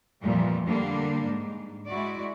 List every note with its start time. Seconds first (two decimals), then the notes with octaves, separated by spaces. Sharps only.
0.22 F2 A#2 E3 F3 G3
0.66 D3 G3 A#3 D4
1.25 G#2
1.89 G#3 E4 F#4 D5